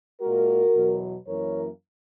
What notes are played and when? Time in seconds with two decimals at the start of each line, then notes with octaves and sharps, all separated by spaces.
0.21 A#2 G#3 F#4 A#4
0.74 E2 B2 F#3
1.27 F#2 E3 A#3 A#4 C#5